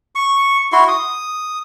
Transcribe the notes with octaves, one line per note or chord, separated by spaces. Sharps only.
C#6
E4 F#4 C6
D#6